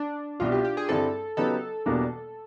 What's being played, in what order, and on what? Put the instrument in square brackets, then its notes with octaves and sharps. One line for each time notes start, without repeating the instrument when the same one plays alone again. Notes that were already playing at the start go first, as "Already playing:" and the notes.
Already playing: [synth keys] D4
[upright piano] C2 B2 G3 [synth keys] F4
[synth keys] G4
G4
G#4
[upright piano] G2 D3 G3 C4 E4 [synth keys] A4
[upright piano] C#3 F#3 B3 D#4 G4 [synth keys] A4
[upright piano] E2 B2 G3 A#3 D4